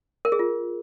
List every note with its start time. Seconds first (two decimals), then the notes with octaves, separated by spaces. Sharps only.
0.25 A#4
0.32 G#4
0.39 F4